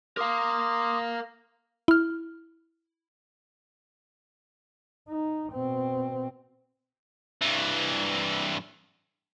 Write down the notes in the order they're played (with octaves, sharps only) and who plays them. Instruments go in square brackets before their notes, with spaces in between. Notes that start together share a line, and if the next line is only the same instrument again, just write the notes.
[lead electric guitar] A#4 F5 [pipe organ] C6 D6 D#6
[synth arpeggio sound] E4 F6
[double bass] D#4
B2 C4
[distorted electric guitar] G2 E3